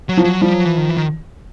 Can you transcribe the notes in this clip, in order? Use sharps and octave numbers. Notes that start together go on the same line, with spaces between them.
F#3
F3
F#3
F3 G3
F#3
E3
D#3
E3
D#3